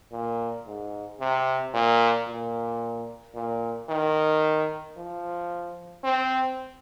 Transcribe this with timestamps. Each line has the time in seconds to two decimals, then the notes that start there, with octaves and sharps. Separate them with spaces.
0.12 A#2
0.67 G#2
1.20 C3
1.74 A#2
2.28 A#2
3.35 A#2
3.89 D#3
4.97 F3
6.04 C4